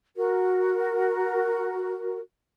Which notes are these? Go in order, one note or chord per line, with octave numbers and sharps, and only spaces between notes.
F#4 A#4